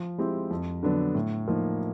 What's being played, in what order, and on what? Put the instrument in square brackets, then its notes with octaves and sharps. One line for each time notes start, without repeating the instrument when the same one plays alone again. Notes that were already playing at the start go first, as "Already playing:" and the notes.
Already playing: [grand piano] F3
G#3 C4 E4 G4
F2
D3 F#3 B3 D4
A2
F3 A#3 D#4